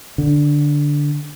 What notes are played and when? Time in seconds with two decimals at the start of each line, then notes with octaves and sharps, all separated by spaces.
0.18 D3